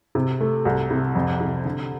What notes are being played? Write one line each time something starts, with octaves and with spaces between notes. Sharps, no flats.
C3
A3
C2
C3
F2
C3
D3